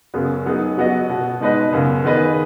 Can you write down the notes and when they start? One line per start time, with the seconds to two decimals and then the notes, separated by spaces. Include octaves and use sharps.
0.14 F#2 C#3 F#3 B3 G#4
0.46 F#3 B3 D#4 G#4
0.78 F#3 B3 F#4 D#5
1.09 B2 B3 F#4
1.40 B2 G#3 D#4 B4 D#5
1.72 F#2 C#3 B3
2.04 D#3 B3 G#4 B4 D#5